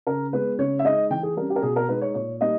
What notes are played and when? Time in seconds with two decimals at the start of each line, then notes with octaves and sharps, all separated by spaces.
0.07 C#3 A#4
0.33 G#3 B3 B4
0.59 C#3 C#5
0.79 E5
0.85 G#3 D#4 D#5
1.10 E3 G5
1.23 G#4
1.37 G3 C#4 A#4
1.50 G4
1.56 A#4
1.62 B2 G#4
1.76 A#4
1.89 G#3 D#4 B4
2.01 C#5
2.14 A#2 C#5
2.41 G3 A#3 D#4 D#5